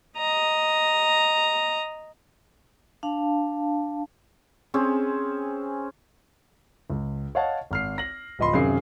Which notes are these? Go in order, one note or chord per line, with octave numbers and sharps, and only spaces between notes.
D#5 A#5
D4 F5 A5
C4 C#4 G#4
C#2
C#5 D#5 F5 F#5 A5
G#1 F6 C7
A#6 F#7
D1 F3 D#5 B5 C6
F#2 C3 D#3 G#4 F5 C7